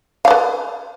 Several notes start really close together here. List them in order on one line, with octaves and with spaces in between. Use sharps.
F5 D5 B4